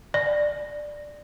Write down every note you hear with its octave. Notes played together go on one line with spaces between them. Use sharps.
D5